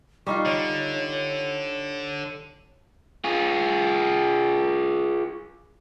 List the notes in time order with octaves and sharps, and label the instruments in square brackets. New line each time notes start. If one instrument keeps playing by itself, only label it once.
[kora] G3 D#4 F4 [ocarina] C#6
[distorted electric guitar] D3 [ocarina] C#5
[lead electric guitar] F4 G#4